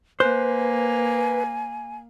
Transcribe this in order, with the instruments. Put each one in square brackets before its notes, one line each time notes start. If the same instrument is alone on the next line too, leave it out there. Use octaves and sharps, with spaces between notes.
[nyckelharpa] A#3 [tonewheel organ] B4 [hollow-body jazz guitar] C5 [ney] G#5